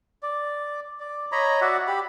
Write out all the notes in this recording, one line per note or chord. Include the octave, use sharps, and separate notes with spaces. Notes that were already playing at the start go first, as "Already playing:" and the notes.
D5
D5
C#5 D#5 A#5 B5
F#4 D5 E5 F#5
G4 B5